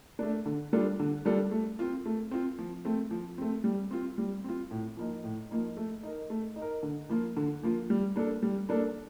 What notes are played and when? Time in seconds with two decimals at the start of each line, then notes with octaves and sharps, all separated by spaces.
0.19 A3 D4
0.46 D3
0.73 G3 D4 F4 A4
1.00 D3
1.25 G3 D4 F4 A4
1.51 A3
1.79 C4 F4
2.06 A3
2.31 C4 F4
2.59 F3
2.85 A3 C4
3.11 F3
3.38 A3 C4
3.64 G3
3.91 C4 F4
4.18 G3
4.44 C4 F4
4.71 A2
4.97 F3 A#3 D#4
5.24 A2
5.51 F3 A#3 D#4
5.77 A3
6.03 D#4 A#4
6.30 A3
6.56 D#4
6.62 A#4
6.83 D3
7.09 F3 A#3 F4
7.37 D3
7.63 F3 A#3 F4
7.90 G3
8.16 A#3 D4 A4
8.43 G3
8.69 A#3 D4 A4